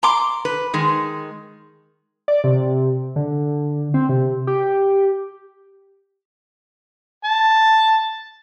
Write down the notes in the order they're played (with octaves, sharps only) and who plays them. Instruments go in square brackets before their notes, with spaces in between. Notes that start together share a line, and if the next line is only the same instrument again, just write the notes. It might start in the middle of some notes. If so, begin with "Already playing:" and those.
[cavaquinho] A#5 C6 D6
[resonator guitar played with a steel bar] B4
D#3 G#3
[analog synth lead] D5
C3
D3
C4
C3
G4
[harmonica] A5